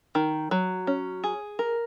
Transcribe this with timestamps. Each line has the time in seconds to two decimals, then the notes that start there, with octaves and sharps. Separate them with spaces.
0.15 D#3
0.51 F#3
0.87 C#4
1.24 G#4
1.59 A#4